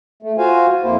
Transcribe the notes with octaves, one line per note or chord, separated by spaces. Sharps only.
A3
F4 F#4 C5 F5 G#5
F2 A#3 E4 C5